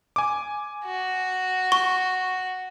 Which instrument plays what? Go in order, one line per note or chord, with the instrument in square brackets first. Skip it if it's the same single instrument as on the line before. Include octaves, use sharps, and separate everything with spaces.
[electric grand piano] G#5 D6
[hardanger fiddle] F#4
[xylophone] C#6